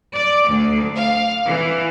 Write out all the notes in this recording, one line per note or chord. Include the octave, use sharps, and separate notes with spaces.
D5
D2
F5
E3